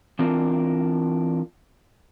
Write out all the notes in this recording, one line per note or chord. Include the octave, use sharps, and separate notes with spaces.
E3 C4 D4 F4 A#4